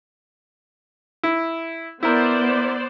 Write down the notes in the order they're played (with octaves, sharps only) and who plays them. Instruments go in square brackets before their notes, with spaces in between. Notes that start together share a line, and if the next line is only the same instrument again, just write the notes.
[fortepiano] E4
[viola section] B3 C5 D5 [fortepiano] E4 A#4